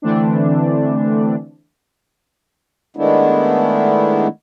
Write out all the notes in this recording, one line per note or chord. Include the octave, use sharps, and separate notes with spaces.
D3 E3 A3 C4 D4
D#3 G#3 A3 B3 D4 E4